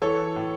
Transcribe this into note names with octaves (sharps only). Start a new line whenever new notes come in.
E3 A4 C#5
A2